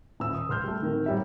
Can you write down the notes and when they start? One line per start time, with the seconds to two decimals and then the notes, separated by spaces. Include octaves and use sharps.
0.20 D#1 E6
0.34 D#6
0.49 C#2 C6 F6 G6
0.64 G3 A3
0.81 D1 D#3 A#4
1.06 F#2 G3 E5